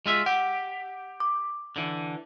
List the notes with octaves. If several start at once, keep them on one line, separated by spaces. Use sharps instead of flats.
G#3 F4 E5
G4 F#5
D6
D3 E3